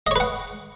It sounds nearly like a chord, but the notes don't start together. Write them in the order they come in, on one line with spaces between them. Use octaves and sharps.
D#5 C#5 B4 F#5